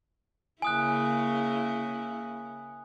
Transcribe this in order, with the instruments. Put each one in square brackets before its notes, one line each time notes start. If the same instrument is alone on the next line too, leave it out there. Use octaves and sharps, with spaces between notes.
[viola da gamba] C#3 A#3 E4 [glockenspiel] G#5 D#6 F#6